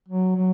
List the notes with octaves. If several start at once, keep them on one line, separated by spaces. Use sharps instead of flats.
F#3
F#3